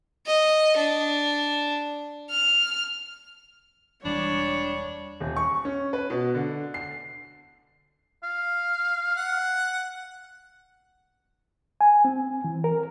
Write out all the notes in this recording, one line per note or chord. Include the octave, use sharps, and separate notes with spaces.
D#5
D4
F6
E1 E3 G3 D4 C#5
D#1
C#6
C#4
B4
B2
D3
C7
F5
F#5
G#5
C4
E3
A#4